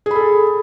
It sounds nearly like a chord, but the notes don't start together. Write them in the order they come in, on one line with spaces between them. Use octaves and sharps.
G#4 B5 A4